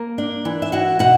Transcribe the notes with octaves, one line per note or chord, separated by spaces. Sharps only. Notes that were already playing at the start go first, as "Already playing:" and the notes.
Already playing: A#3
D4
E3
E5
E4 F#4 F#5
B2 F#4 F#5